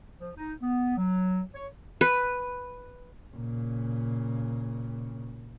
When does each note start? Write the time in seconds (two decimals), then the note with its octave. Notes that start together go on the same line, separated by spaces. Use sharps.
0.19 F3
0.36 D#4
0.62 B3
0.97 F#3
1.54 C#5
2.01 B4
3.35 A#2 C#3